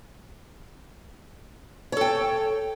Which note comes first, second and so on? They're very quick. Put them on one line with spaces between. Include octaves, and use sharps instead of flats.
C#5 A4 G5